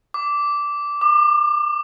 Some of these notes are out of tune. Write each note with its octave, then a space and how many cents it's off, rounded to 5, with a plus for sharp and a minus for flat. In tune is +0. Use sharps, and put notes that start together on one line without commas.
D6 -10
D6 +35